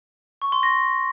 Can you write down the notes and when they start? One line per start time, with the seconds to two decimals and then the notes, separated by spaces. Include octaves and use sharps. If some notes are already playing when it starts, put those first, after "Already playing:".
0.42 C#6
0.52 C6
0.63 A#6